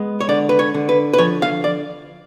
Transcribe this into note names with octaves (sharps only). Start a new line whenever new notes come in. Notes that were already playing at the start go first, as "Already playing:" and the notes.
Already playing: G#3 B3
C#5
D3 D5
B4
C#5
D3
B4
B4
F3 C#5
F5
D5